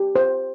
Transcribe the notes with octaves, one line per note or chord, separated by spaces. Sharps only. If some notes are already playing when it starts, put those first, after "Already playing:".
Already playing: G4
C5